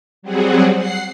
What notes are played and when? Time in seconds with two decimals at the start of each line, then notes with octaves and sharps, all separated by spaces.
0.22 F#3 G3 C4 F#4 G#4
0.75 F#5 C7